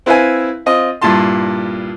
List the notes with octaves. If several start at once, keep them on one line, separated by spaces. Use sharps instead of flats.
C4 E4 B4 E5 F5 G#5
C4 F4 D#5
G2 A#2 E4 A5 C6